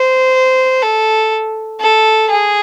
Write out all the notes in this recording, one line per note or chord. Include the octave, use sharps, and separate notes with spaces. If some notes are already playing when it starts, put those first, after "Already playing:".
Already playing: C5
A4
A4
G#4